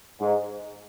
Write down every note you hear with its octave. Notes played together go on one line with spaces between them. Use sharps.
G#2